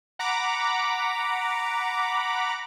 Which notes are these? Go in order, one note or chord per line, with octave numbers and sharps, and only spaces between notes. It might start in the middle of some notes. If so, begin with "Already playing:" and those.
F#5 A#5 B5 D6